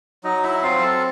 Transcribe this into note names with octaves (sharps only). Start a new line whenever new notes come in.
F#3 D#4 D#5
E4 E5
C4 F4 F5
A4 A5